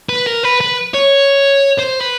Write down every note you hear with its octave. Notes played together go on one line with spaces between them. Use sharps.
B4
A#4
B4
B4
C#5
C5
B4